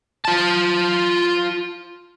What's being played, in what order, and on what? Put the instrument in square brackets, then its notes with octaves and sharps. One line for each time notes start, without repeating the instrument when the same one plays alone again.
[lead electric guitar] F4 A5